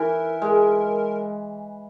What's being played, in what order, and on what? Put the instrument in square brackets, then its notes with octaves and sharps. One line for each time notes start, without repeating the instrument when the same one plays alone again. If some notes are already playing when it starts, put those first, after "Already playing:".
Already playing: [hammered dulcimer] E3 [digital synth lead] A#4
[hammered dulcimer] G#3